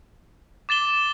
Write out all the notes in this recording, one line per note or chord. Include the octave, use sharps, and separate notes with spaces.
D6 A6 E7 G7